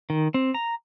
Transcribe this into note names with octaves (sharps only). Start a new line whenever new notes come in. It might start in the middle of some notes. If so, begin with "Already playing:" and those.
D#3
C4
A#5